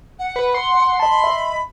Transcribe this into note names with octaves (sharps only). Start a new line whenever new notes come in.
F#5
B4
C6
D#5 A5 B5
D#5 E5